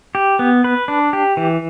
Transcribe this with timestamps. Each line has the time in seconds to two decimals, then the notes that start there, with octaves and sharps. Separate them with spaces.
0.15 G4
0.39 B3
0.64 B4
0.88 D4
1.13 G4
1.37 E3